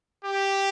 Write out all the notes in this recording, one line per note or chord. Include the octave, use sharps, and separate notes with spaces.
G4